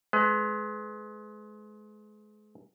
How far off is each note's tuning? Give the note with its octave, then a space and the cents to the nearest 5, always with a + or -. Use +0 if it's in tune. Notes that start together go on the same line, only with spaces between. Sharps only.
G#3 +30 B4 +35